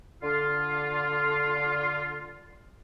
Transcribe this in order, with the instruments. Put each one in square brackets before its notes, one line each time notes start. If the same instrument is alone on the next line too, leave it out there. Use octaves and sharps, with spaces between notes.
[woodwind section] D3 F4